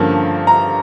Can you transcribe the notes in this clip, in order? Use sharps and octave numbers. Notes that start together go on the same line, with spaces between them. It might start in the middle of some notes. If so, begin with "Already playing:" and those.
Already playing: G2 D3 F3 A#3 C#4 A5
A#5